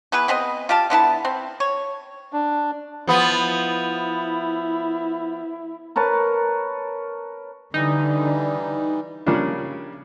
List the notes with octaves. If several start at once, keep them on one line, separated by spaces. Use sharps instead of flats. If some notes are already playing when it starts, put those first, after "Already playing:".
E3 B3 G#4 B4
B3 C4 G#4 D#5
F4 G4 F5 A5
D3 B3 E4 A5
C4
C#5
D4
F3 B3 E4
A#4 B4 C#5 A5
D3 E3 G3 D#4
C#3 F3 G3 A#3 C#4 D4